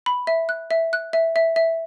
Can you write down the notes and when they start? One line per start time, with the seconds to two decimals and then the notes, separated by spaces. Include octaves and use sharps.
0.06 B5
0.27 E5
0.49 F#6
0.71 E5
0.93 F#6
1.13 E5
1.36 E5
1.56 E5